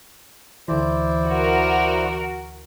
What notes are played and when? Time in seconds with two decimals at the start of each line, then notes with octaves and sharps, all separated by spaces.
0.68 D2 E3 E4 C5 D5
1.28 F#4 A#4